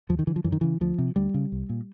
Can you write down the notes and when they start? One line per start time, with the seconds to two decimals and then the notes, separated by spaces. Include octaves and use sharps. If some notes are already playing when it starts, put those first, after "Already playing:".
0.09 D#2 F3
0.19 D#3
0.27 D3 E3
0.36 F3
0.44 F#2 E3
0.52 D#3
0.61 C#3 E3
0.81 D2 F3
0.98 C3
1.16 D2 G3
1.34 C#3
1.52 C2
1.69 A#2